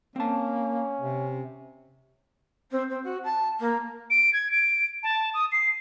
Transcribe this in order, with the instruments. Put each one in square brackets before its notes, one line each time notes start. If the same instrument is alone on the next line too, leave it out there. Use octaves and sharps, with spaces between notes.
[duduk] A#3 [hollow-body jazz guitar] C4 A5 [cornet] C#4
[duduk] C3
[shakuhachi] C4
C4
F#4
A5
A#3
[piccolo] D7
G#6
D7
A5
D#6
C7